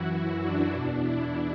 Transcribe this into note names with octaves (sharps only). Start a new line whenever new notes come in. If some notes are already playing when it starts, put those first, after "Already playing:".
Already playing: F#2 E3 E4 F#4
E4
D4
E2 B2
E4